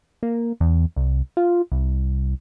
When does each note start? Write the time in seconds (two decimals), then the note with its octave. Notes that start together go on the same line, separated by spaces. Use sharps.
0.23 A#3
0.60 E2
0.96 C2
1.37 F4
1.72 C2